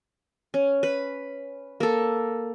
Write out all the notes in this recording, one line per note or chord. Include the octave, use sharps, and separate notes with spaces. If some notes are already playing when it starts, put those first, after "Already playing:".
C#4
B4
A#3 A4